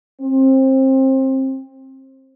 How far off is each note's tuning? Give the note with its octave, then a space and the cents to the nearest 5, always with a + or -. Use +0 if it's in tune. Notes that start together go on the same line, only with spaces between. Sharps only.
C4 +25